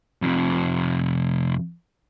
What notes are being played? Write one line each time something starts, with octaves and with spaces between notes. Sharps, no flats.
F2 C3